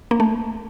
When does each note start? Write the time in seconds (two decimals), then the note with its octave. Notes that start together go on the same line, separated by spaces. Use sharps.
0.11 A#3
0.20 A3